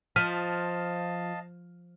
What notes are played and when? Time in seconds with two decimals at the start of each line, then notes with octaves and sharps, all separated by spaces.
0.16 F3 D#5 F5 A5 F6 B6 D#7